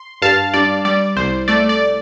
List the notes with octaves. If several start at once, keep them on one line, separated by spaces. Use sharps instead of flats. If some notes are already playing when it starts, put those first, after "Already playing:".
Already playing: C6
G2 F5 A5
G2 D5
G3 D5
C2 C5
A3 D5
D5